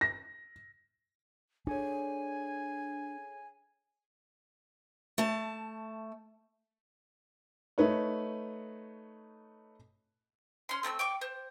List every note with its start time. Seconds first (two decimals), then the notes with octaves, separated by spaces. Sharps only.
0.01 A#6
1.67 D4 G#4 A4 C#5 G#5
5.18 A3 A5
7.78 A3 D#4 B4 C#5
10.69 C#4 C6
10.83 A3 C4 A5 E6
10.99 G5 C#6 D6
11.21 C5